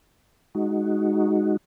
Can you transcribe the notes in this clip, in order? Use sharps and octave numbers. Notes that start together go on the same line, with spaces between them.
G#3 D#4 F#4